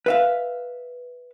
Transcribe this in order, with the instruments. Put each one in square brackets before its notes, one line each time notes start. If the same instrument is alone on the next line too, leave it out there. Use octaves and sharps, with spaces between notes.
[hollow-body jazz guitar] B4 E5 F5